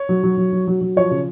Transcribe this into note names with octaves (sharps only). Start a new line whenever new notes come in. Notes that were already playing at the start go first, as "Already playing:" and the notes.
Already playing: C#5
F#3
F#3
F#3
F#3
F#3
F#3
F3 C#5
C#3